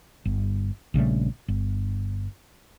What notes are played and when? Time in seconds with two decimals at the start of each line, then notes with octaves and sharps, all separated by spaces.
0.25 G1
0.94 A#1 C#3 G3 A3
1.48 G1